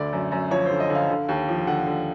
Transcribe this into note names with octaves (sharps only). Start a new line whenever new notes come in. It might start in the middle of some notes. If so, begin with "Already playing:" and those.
Already playing: D2 D3 D5
F#2
F#2
F3 C#5
C5
D3
D#5
D3
F5
D3
D#2
F3
D3 F#5
D3